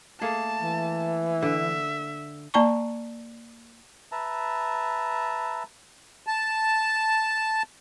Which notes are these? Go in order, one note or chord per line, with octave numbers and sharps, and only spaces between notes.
A3 A#3 G#4 A5
E3
D3 E5
A#3 D5 A5 A#5 C#6
B4 E5 A5 A#5
A5